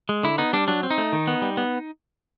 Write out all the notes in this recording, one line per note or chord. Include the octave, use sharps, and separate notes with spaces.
G#3
D3 E4
B3 D#4
G3 D4
F#3 D4
C4
D#4
A3
D#3
B3
G3
B3